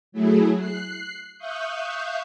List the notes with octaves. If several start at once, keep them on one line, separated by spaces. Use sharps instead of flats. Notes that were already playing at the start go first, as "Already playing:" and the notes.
F#3 A3 E4 G#4
F#6 C7
E5 F5 C#6 D#6 F#6 G6